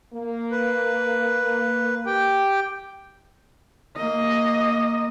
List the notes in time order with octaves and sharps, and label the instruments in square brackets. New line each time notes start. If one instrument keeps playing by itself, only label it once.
[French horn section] A#3
[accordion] B4
G4 G5
[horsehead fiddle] A#3 D#5